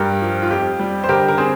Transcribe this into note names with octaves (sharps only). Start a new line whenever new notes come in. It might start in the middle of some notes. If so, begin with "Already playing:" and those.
Already playing: G2 G4 A#4
F3
F4
F2 G4
G3
C5
D3 G4 A#4
A#4
C4 G#4 C5